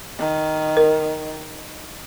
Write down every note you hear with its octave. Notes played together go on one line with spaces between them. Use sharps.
D#3
A#4